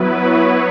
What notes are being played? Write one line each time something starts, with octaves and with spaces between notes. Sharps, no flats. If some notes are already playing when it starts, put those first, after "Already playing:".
Already playing: F#3 B3 E4 B4
C#5